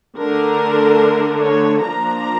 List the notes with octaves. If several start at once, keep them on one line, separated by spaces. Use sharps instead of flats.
D3 A3 D4 A#4
C#5
F3 A#3 D4 A#5